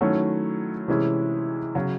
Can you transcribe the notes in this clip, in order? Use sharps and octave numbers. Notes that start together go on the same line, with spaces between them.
D#3 F#3 A3 C#4 E4
C3 E3 G#3 C#4 E4
C#3 F#3